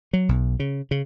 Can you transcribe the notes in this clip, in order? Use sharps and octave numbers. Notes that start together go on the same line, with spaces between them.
F#3
B1
C#3
C#3